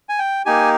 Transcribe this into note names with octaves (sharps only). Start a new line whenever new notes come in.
G#5
G5
A#3 D#4 G4 G#5